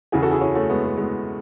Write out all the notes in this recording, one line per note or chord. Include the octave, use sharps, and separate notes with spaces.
E2 C#3 E3 E4 G#4
F#4 A4
E4 G#4
C#4 E4
A3 C#4
G#3 B3
A3
G#3 B3